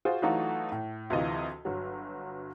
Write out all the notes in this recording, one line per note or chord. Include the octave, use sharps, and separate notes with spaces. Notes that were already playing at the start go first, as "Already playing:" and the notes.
F4 F#4 G#4 C5
E3 F#3 A3 D#4 F4 F#4
A2
D2 C3 E3 F4 D#5
G1 F#3